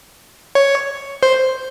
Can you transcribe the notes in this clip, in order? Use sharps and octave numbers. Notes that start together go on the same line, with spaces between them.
C#5
C5